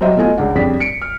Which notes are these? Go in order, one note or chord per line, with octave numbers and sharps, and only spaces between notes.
F#3 G3 C5 D#5 E5
B2 A3 F4 D#5 G#5
C#2 D4 F#5
F2 C#3 G3 D4 D5 B6
C#7 D7
F6